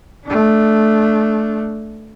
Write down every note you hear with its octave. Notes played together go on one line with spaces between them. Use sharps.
A3 D4